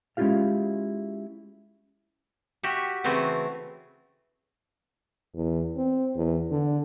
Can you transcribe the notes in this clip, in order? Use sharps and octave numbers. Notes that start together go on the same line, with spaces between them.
G#3 C#4 E4 F4 G4 F5
F#4 G4 E5 F#5
C#3 E3 A3 C4 F#4
E2
C4
E2
D3